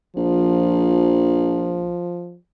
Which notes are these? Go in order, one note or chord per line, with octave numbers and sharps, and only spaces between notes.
A#1 F3